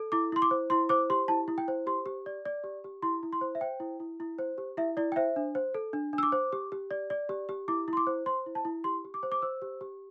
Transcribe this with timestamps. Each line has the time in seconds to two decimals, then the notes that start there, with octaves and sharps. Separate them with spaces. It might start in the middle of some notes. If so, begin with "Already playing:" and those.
Already playing: A4
0.12 E4 D6
0.32 E4 C6
0.42 D6
0.51 C5
0.70 E4 C6
0.89 C5 D6
1.10 G4 C6
1.28 E4 A5
1.48 E4
1.58 G5
1.68 C5
1.87 G4 C6
2.06 G4
2.26 D5
2.46 D5
2.64 G4
2.84 G4
3.02 E4 C6
3.23 E4
3.33 C6
3.41 C5
3.55 E5
3.61 C5 G5
3.80 E4
4.00 E4
4.20 E4
4.39 C5
4.58 G4
4.77 E4 E5
4.97 E4 D5
5.12 G5
5.16 C5 E5
5.36 D4
5.55 C5
5.75 A4
5.93 D4
6.13 D4
6.18 E6
6.23 D6
6.32 C5
6.53 G4
6.72 G4
6.91 D5
7.10 D5
7.29 G4
7.49 G4
7.68 E4 D6
7.88 E4
7.93 C6
7.97 D6
8.07 C5
8.26 C5 C6
8.46 E4
8.55 A5
8.65 E4
8.84 G4 C6
9.04 G4
9.14 D6
9.23 C5
9.32 D6
9.42 C5 E6
9.62 G4
9.81 G4